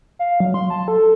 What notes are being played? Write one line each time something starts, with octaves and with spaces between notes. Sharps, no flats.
F5
F#3
C6
A5
A4